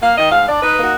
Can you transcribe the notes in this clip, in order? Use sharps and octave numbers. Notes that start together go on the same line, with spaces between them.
A#3 F5
D#3 D#5
G#2 F5
D4 D5
D#4 B4
A#3 F#4